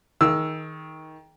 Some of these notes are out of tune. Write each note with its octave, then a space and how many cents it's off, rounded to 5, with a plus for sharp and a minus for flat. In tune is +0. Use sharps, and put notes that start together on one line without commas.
D#3 +20 G#4 +40 E6 +0